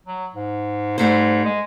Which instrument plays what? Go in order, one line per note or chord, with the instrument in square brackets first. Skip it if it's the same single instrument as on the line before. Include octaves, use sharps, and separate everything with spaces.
[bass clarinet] F#3
G#2
[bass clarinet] G#2 [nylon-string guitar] G3 A3 C5
[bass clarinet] G#3